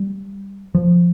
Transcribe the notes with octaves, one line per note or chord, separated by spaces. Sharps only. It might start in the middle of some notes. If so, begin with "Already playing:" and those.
Already playing: G3
F3